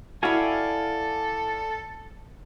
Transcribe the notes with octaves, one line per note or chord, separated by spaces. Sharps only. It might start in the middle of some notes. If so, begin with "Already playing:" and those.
E4 F#4 A4 D5 F5 G#5